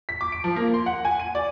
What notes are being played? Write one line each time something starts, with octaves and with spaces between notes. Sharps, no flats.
B6
D6
D7
F3
A#3
C6
F#5
G#5
D#7
D5